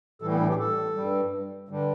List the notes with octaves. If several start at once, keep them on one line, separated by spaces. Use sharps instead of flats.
A2 E3 G3 A4
B3
D4
G4
A4
G2 G3
G2 D3 G3